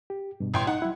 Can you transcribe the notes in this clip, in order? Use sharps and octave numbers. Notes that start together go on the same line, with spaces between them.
G4
G2 B2
A1 G5 C6
D#4 F#5
F#3 E4